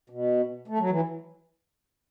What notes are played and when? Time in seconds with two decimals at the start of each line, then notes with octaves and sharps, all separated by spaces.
0.10 B2
0.68 A3
0.79 F#3
0.90 E3